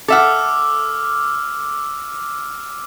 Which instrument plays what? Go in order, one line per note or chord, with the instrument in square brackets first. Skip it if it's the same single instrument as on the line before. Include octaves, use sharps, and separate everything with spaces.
[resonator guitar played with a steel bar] A4 E5 F#5 [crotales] D6 E6 F6